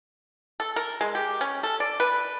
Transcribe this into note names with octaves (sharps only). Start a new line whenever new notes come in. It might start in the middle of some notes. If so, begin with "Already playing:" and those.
A4
A#4
G#3
G4
C#4
A4
D5
B4